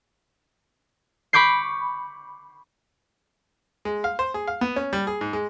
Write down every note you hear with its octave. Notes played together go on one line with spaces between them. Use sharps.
B5 C#6 D6 G6 C7
G#3
F5
C5
G#4
F5
B3
C#4
G3
G#4
G#2
G#3